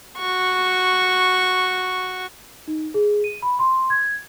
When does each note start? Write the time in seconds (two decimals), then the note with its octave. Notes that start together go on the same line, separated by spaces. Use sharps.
0.17 F#4 C#6
2.68 D#4
2.94 G#4
3.24 D#7
3.42 B5
3.59 C6
3.90 G#6